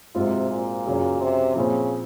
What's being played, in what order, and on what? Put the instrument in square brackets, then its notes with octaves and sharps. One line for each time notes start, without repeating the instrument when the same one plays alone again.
[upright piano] G#2 F#3 C4 F4 [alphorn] C3
[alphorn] A#2
[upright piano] F#2 C#3 F#3 C#4
[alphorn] C3
[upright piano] A#2 F3 C4 [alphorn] C#3